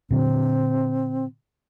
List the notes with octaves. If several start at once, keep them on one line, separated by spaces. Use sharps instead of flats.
A#2 D3 F#3 C4